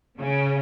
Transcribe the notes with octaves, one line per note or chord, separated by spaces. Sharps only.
C#3